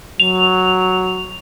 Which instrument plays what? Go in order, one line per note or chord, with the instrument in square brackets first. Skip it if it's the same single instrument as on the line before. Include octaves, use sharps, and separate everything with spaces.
[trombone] F#3 [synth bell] F7